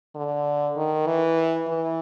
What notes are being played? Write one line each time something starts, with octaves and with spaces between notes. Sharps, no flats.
D3
D#3
E3
E3